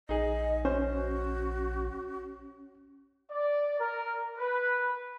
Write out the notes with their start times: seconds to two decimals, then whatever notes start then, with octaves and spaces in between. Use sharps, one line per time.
0.09 A#1 D#4 G#4 D#5
0.65 C#4 F#4 C5
3.31 D5
3.79 A#4
4.38 B4